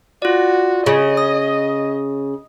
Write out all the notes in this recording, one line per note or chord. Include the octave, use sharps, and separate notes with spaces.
F4 F#4 D5
C#3 D#5
D#6